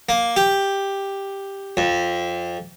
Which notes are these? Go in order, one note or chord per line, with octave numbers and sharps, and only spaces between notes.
A#3
G4
F2